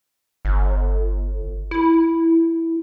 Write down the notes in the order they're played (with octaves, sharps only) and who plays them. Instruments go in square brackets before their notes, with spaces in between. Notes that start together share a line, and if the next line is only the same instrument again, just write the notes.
[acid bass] G1
E4